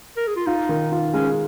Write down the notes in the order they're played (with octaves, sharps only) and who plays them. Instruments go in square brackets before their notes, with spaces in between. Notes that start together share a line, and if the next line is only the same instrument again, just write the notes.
[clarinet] A#4
G#4
F4
[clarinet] D#4 [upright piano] F4
[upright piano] D#3
F4
[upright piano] G#3 [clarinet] C#4